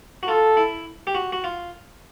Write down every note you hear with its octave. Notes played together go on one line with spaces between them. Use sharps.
F#4
F4 A4
E4
G4
F#4
F#4
F4